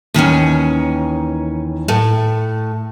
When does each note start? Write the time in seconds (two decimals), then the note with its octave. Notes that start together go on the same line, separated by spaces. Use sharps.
0.14 D#2 D#3 E3 C#4
1.88 A2 A3